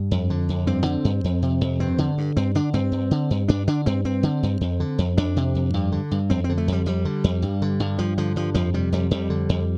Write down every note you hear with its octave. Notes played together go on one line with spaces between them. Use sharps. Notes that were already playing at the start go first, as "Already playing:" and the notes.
Already playing: G2
F2
D3
F2
G2 C4
D3
G2
F2
C3
F2
G2 C4
D3
G2
G2 C4
D3 D4
G2 C4
G2
D3
G2
G2 D4
D3 D4
G2 C4
G2 C4
D3
G2
F2
D3
F2
F2 D4
C3
F2
G2
D3
G2
F2 C4
C4
D3
A3
F2 G3
F2 G3
D3
F2
G2
D3
G2
G2 F3
D3 F3
G2 F3
F2 F3
C3 G3
F2 G3
F2 G3
D3
F2